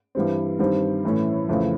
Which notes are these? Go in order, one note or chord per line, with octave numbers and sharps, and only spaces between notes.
G2 E3 G3 C4
G2 D#3 G3 C4
A2 E3 A3 C#4
F2 C#3 E3 A3